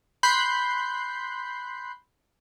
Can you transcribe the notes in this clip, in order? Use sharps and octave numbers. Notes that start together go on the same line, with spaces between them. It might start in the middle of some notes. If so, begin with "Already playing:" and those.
B5 C6 F#6 G6 C7